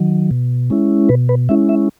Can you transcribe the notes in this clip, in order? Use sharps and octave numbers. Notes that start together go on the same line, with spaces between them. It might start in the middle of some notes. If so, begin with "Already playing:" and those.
Already playing: D#3 F#3
B2
G#3 C#4 E4
B2 B4
B4
G#3 C#4 E4 E5
E5